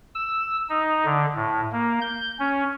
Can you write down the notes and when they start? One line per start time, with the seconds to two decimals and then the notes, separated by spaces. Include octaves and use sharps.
0.15 E6
0.69 D#4
1.05 D3
1.36 A2
1.72 A#3
2.01 G6
2.40 C#4